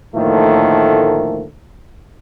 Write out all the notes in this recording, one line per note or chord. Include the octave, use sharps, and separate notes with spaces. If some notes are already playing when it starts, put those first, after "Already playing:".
A2 D3 D#3 F3 A3 A#3